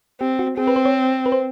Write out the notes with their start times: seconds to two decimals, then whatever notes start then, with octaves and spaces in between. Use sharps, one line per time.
0.21 C4 G4
0.39 F#4
0.58 C4 G#4
0.67 B4
0.76 C5
0.85 C#5
1.26 B4
1.32 C5